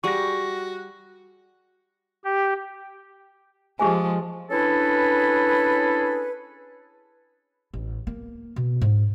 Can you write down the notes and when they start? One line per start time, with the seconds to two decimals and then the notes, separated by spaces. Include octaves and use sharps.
0.04 G3 F#4 G#4 C#6 A#6
2.24 G4
3.79 F3 G#3 G4 G#4 G#5
4.50 C#4 D4 E4 G#4 A4 B4
7.73 A1
8.07 A#3
8.56 B2
8.81 G#2